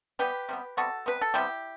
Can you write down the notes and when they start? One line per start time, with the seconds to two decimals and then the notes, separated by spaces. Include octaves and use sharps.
0.19 E3 G3 B3 G4 B4
0.49 C3 G3 B3
0.77 C3 G3 B3 F#4 A4
1.06 C3 G3 B3 B4
1.21 A4
1.34 C3 G3 B3 E4 G4